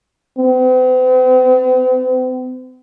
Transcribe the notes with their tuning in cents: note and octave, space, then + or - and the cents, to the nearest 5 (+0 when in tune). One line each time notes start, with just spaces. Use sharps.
C4 -45